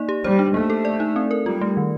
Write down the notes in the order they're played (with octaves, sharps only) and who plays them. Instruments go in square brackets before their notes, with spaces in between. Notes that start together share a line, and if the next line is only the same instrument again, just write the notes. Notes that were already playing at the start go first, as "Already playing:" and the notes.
Already playing: [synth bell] A#3 D#4 D5
G4
[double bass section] G3 [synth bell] C5
[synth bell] D4
[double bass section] A3 [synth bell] A#3
[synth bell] A4
D5
D#4
C4
A#4
[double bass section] G3 [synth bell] F4
[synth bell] A3
D#3